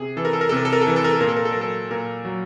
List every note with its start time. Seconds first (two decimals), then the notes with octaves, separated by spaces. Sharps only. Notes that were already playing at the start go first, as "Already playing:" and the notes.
Already playing: C3 G#4
0.17 E3 A4
0.25 A#4
0.33 A4
0.41 A#4
0.49 C3 A4
0.57 A#4
0.65 A4
0.73 A#4
0.81 A4
0.87 E3 A#4
0.96 A4
1.04 A#4
1.13 A4
1.21 A#2 A#4
1.29 A4
1.37 A#4
1.45 A4
1.52 A#4
1.56 F#3
1.61 A4
1.91 A#2 A#4
2.25 F#3